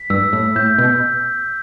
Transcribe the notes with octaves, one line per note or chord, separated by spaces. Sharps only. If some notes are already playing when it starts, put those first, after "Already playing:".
Already playing: B6
G2 E6
A2
A2 G6
B2